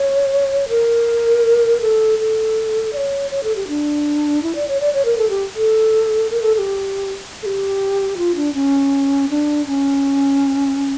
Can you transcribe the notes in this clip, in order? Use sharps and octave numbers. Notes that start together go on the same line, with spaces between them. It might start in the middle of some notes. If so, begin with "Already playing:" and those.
Already playing: C#5
A#4
A4
A4
D5
C#5
C#5
A4
G4
D4
E4
D5
C#5
D5
C#5
A#4
A4
G4
A4
A#4
A4
A4
G4
A4
G4
F4
D4
C#4
D4
C#4